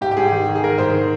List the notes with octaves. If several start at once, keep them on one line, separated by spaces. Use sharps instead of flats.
G#2 G4
G4
G#2 G#4
D#3
D#3
G#4
G#2 A#4
G#2 C5
D#3